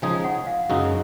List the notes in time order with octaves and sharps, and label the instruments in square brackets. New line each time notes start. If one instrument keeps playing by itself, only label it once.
[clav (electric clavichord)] C#3 F3 G#3 D#4 G#4 [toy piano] G#5
[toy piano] F#5
F5
[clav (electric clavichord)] F#2 C#3 G#3 D#4 F#4